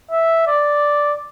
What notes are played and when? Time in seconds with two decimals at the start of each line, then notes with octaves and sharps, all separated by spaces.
0.11 E5
0.47 D5